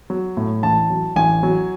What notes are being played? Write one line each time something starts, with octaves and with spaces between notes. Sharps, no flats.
F#3
A2
A1 A5
F#3
A1 G#5
F#3